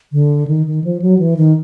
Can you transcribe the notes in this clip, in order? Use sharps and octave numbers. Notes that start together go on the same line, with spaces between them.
D3
D#3
D#3
F3
F#3
E3
D#3